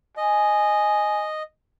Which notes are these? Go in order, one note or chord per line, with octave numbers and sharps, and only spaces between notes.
D#5 G#5